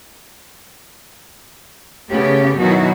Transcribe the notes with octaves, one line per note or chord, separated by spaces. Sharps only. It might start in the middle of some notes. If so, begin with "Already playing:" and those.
C#3 A3 B3 G4 C#5
B2 D#3 F#3 D#4 E4 F#4